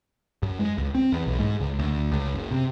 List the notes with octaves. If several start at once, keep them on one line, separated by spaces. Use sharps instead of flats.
F#2
G#3
C#2
C4
E2
B1
G#2
C#2
D2
C#2
F#1
C3